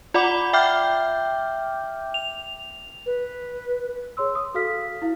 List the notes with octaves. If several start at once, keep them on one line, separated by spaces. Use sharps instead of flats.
F4 D5 F#5 B5 D6
E5 G5 D6 F6 G6
F7
B4
G#4 C#5 C6 E6
D#6
F#4 A4 F5 F6 B6
E4 F5